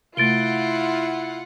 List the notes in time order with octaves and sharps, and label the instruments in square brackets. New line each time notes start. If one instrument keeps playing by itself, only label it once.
[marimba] C3 A3 [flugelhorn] E4 [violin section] F4 F#5 [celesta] A6 D7 G7